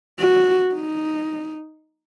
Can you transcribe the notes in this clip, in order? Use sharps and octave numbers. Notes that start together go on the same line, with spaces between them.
F#4
D#4